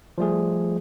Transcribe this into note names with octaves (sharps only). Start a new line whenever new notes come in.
F3 G3 A3 G#4